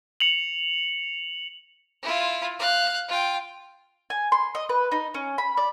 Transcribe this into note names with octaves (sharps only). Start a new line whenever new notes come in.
C#7 F7 F#7
E4 F4
F5 F#6
F4 G5
G#5
C6
D#5
B4
D#4
C#4
B5
D5